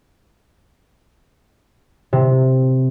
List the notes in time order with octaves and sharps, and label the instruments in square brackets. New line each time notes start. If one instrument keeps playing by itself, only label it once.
[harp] C3